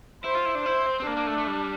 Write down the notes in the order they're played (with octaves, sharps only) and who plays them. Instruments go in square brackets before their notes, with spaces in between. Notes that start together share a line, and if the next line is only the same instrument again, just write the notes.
[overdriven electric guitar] E4 [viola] C5
[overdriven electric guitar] F4
E4
D4
[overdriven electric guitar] E4 [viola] C5
[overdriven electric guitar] C4
C4
[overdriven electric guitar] A#3 [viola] D4
[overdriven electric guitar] A#3
A3
A3
G3